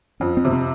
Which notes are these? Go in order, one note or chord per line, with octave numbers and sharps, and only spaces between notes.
F2 C#4
C4
C3
C4